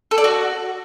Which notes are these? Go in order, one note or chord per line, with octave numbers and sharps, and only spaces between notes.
A4
D5
F#4